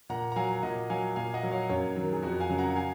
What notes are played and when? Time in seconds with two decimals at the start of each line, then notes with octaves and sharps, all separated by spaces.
0.09 A#2 F#5 A#5
0.32 A#5
0.36 F#3 F5 G#5
0.63 A#2 D#5 F#5
0.90 F#3 F5 G#5
1.16 A#2 F5 G#5
1.34 D#5 F#5
1.43 F#3
1.51 C#5 F5
1.69 F#2 A#4 C#5
1.96 D#3 F#3
2.13 G#4
2.22 F2 F#4 A#4
2.40 F5 G#5
2.50 C#3 F#3
2.58 F#5 A#5
2.76 F5 G#5